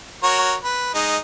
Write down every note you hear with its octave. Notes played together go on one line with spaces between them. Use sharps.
F#4 A#4 C#5
B4
G#3 D#4